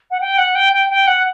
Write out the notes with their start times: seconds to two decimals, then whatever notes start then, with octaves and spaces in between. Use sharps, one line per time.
0.11 F#5
0.21 G5
0.38 F#5
0.55 G5
0.73 G5
0.90 G5
1.07 F#5